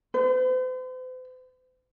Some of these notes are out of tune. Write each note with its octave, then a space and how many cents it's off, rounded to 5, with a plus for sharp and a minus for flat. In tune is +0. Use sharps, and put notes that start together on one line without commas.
C5 -45